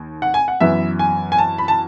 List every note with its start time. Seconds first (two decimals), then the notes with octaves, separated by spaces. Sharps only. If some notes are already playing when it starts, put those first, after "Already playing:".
Already playing: D#2
0.22 F#5
0.34 G#5
0.48 F#5
0.60 F#2 E3 B3 E5
0.99 G#5
1.32 G#5
1.38 A5
1.58 B5
1.68 A5